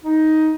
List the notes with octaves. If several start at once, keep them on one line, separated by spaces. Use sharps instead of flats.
D#4